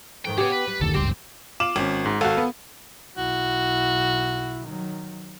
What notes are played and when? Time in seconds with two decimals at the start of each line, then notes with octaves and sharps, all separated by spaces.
0.25 F2 G#2 D#3 G5
0.38 B3 G4 G#4 C#5
0.52 B4
0.67 G3
0.81 F1 D2 D#3 A4
0.95 F#1 C#2 G2 C4 G4 C6
1.60 F4 D6 E7 F#7
1.76 G#1 C#4
2.06 G#2
2.21 G#1 F#4 A4 F5
2.37 B3
3.17 B1 E4 F#4
4.64 D#3 F#3